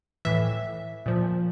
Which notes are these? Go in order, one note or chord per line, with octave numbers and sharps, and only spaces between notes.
A2 E3 E5
A#2 F3